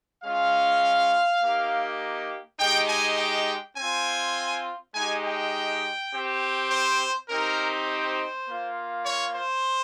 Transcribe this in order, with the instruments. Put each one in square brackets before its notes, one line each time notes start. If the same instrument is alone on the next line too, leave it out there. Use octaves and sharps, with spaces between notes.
[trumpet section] G#3 C#4 F4 F5
A#3 D#4 G4
G#3 D#4 G4 G5
G#5
G5
C4 F4 G#5
G#3 D#4 G4 G#5
G5
C4 G4
C5
C4 D#4 G4 A#4
C5
A#3 F4
C#5
C5